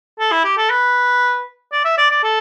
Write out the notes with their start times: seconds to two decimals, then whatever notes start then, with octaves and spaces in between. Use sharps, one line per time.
0.20 A4
0.32 E4
0.45 G4
0.58 A4
0.70 B4
1.72 D5
1.85 E5
1.98 D5
2.10 D5
2.23 A4